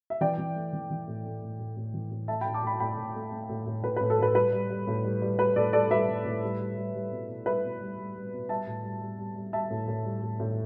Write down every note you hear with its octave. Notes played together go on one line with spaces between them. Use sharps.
E5
E3 D5 G5
E3
A3
E3
E3
A2
A3
A2
A2
A2
E3
A2
A3 E5 A5
A2 G5 B5
A5 D6
A2 G5 B5
A2 G5 B5
A2
A3
A3
A2
A2
A2 B4
A2 B4
A4
A2 B4
G3 B4
G3
G3
A2
G3
G3
G3 B4
A2 A4 D5
G3 A4 D5
G3 B4 E5
A2
A2
G3
G3
G3
G3
B2
B2
G3 B4 E5
B2
G3
G3
G3
B2
G3 E5 A5
A2
G3
G3
G3
G3
G3 E5 A5
A2
A2
G3
A2
A2